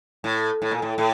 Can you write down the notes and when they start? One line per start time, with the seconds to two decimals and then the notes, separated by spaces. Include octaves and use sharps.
0.24 A2
0.62 A2
0.71 A#2
0.82 A2
0.98 A2